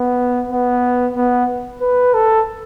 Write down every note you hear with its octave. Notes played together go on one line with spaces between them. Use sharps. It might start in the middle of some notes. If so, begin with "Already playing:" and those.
Already playing: B3
B3
B3
B4
A4